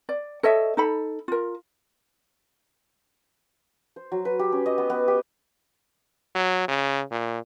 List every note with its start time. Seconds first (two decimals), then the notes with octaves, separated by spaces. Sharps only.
0.09 D5
0.43 A4 C#5 D#5 E5
0.77 D#4 A4 B5
1.28 F4 A#4
3.96 C5
4.12 F#3
4.25 B4
4.39 G4
4.52 C#4
4.66 D#5
4.78 B3
4.90 B3
5.08 G4
6.35 F#3
6.68 C#3
7.11 A#2